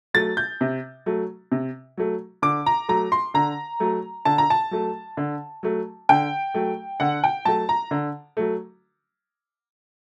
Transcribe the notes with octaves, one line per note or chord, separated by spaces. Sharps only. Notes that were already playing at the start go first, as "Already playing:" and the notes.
F#3 A3 A6
G6
C3
F#3 A3
C3
F#3 A3
D3 D6
A#5
F#3 A3 A#5
C6
D3 A#5
F#3 A3
D3 A5
A#5
A5
F#3 A3
D3
F#3 A3
D3 G5
F#3 A3
D3 F#5
G5
F#3 A3 A5
A#5
D3
F#3 A3